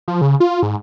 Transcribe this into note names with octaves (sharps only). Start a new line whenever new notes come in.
F3
C#3
F4
G#2